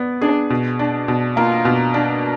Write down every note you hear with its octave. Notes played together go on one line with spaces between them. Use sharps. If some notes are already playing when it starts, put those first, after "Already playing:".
Already playing: B3 D5
D4 G#4
B2
D4
B2
A#3 F4
B2
D4